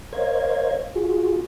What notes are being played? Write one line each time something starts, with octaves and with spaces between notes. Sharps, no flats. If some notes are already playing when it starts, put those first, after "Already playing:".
A#4 C5 C#5 D#5 F5 G#6
F4 F#4 G#4